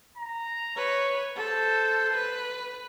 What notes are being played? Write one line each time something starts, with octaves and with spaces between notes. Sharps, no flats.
A#5
B4 C#5
A4 C5
B4